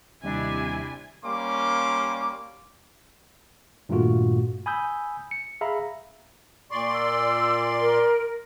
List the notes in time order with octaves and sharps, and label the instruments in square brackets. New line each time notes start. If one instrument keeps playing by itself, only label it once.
[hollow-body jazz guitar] D#2 G3 D#5 [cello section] C3 E4 G4 [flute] D4 [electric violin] G#5
[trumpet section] G3 A#3 C#4 C6 D6
[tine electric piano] G2 A#2 D#3 A3 F4 F#4
G#5 B5 D#6 E6 G6
C#7
G#4 E5 F5 A#5 B5
[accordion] A#2 D5 C6 [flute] C#6
[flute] E6
A#4